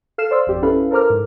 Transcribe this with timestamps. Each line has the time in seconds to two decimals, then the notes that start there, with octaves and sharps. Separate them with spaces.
0.18 A4 F5 F6 C7 E7
0.31 C5 D5 C6 E6
0.47 G#1 F2 G4 D5
0.62 C#4 E4 A4 B4 F5 B5
0.91 A4 A#4 C5 A#5 D6 F6
1.10 G#2